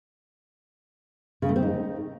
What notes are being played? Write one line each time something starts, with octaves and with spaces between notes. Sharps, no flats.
C#3
A3
C4
D#4